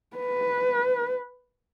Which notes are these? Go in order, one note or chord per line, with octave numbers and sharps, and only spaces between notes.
B4